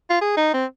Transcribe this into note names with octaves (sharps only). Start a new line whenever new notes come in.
F4
G#4
D#4
C4